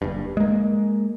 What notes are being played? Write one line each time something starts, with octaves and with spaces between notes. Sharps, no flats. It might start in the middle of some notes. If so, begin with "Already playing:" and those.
F#1 G2
G#3 A#3